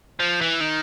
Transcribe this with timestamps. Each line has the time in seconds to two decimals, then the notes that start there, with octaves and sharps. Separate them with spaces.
0.20 F3
0.41 E3
0.61 D#3